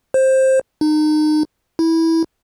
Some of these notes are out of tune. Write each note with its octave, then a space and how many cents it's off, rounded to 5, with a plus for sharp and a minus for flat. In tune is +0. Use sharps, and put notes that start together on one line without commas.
C5 +15
D#4 -30
E4 -15